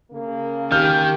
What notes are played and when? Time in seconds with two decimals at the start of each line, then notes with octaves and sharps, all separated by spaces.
0.11 C#3 A#3
0.72 D#3 G4 F6 G6